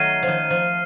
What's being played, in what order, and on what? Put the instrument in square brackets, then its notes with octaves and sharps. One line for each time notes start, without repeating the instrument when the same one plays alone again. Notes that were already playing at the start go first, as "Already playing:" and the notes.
Already playing: [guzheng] D#3 F#3 A3 [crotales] F6 C7 D#7
[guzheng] D#3 F3
F3